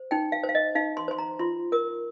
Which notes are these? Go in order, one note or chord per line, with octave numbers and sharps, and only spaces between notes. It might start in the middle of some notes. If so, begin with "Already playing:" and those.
Already playing: C5
D#4 G5
F5
C5
F5
D#5
D#4 F5
C6
C5 C6
A#5
F4 C6
A#4 D#6